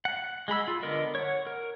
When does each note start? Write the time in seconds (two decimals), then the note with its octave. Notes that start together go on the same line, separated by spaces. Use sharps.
0.05 F#5
0.48 G#3 G#4 B5 E6
0.68 F4
0.83 D3 B3 A#4 D#5
1.15 C#5 F#5
1.47 A#4